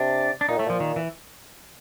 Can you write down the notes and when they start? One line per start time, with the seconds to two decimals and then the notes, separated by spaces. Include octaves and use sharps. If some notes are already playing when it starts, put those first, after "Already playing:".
Already playing: C3 D4
0.41 D4
0.49 A#2 D#4
0.57 A2 A3
0.66 A#2 F3
0.80 D#3
0.96 E3